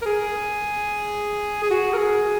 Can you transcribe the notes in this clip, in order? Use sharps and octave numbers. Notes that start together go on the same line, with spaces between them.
A#4
G#4
G#4
F#4
A#4
G#4